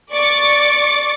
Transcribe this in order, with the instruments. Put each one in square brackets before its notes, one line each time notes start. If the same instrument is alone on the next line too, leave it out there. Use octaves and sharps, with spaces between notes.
[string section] D5 C#6 D6 A6 C#7